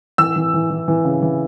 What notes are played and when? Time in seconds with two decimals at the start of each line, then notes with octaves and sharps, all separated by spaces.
0.18 E3 E6
0.36 E3
0.54 E3
0.70 E3
0.88 E3
1.05 C#3
1.22 E3